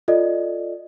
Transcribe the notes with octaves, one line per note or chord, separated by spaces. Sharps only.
F4 A4 D5 D#5